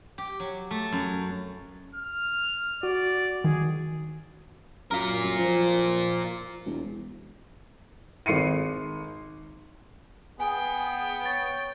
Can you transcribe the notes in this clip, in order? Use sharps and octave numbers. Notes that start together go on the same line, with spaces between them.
G4
F#3
A3
F#2
F6
F#4 D5
D#3 G#4
F#2 F4 A#4
F#2
F3
E1
G#1 C7 C#7 D#7
B3 G#4 G5 G#5
C#5 A6